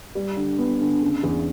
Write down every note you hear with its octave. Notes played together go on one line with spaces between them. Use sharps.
G3
D3
B3
D3
C#3
E2